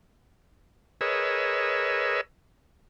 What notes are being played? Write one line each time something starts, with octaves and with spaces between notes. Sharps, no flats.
G#4 A#4 B4 C#5 D#5 E6